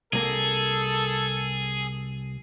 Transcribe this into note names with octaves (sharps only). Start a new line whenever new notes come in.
C2 A#3 G#4 A4